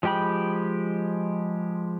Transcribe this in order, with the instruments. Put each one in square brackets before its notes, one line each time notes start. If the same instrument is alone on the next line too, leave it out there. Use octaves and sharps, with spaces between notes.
[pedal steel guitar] F3 G#3 G4 G5 B5